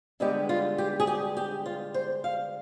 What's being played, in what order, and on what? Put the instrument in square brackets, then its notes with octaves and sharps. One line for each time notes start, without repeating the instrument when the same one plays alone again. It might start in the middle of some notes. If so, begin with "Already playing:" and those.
[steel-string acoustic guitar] G2 D3 G#3 B3 G4
F4
G4
G#4
G4
G4
F4
C5
F5